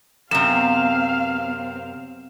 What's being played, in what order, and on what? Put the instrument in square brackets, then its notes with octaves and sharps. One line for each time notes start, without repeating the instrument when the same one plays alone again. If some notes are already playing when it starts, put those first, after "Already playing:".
[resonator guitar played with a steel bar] F#2 C3 [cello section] B3 C4 [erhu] F5 [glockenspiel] E7